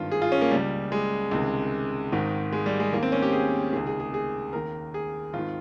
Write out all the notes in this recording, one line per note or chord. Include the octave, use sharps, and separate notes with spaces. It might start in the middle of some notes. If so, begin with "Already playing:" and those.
Already playing: G#1 G2 D#3 F4
G#4
F4
C#4
A#3
C#2 C#3 G3
G#3
C#2 C3 D#3
G#1 G#2 D#3
G#3
G3
G#3
D#2 D#3 A#3
C4
C#4
G4
G#4
C#2 C3 D#3 G#4
G#4
G#4
G#4
D#2 D#3 A#4
G#4
G#1 D#3 F4